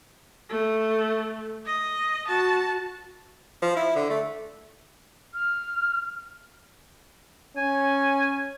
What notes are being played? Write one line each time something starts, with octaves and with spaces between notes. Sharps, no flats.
A3
D#5
F#4 A5
F3
E4
D3
A3
F6
C#4 G#5